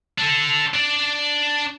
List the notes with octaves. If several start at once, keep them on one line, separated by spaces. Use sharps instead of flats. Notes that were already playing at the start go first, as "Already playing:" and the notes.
D4 A4
D4 D5